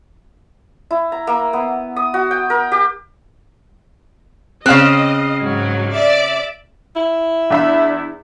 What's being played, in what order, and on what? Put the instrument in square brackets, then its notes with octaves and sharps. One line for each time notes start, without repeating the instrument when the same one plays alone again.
[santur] E4
A#5
A#3
B3
D#6
F#4
G5
A#4
G4
[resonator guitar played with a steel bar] C#3 C4 [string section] D#5 [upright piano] F5 F6 F#6
[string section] G#2 F#3
D5 E5
[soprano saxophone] E4
[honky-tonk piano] E2 E5 B5 [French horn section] D4